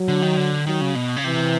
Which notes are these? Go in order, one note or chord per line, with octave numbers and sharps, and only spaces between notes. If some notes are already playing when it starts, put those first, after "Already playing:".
Already playing: F#3
D3
D#3
D3
D#3 F#3
C#3
B2
C#3
C3 E3